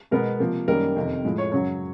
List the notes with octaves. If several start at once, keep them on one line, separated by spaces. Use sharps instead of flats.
B2 G#3 B3 A#4
C3 F3 A#3
F#2 D#3 G3 A#3 A#4
F2 C3 D#3
A2 F3 G#3
C#5
F#2 C#3 F#3 C#5